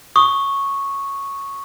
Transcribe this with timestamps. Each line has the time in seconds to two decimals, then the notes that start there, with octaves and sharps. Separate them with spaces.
0.16 C#6 D#6